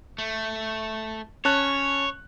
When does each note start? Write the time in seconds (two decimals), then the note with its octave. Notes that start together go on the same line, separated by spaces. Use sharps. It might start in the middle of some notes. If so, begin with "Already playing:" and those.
0.18 A3
1.45 C#4 C#5 A5 F#6